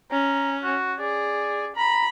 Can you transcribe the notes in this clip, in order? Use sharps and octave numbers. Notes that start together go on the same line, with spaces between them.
C#4 A#5
F#4
G#4 D5
A#5 B5